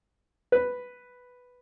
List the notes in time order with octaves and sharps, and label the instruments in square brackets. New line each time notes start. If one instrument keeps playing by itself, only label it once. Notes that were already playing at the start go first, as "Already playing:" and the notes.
[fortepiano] B4